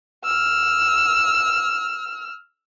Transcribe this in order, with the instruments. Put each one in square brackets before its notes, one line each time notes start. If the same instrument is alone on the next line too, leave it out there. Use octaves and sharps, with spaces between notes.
[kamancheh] E6 F6